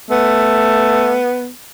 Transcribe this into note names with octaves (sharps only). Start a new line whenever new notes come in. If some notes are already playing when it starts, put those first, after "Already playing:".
A3 B3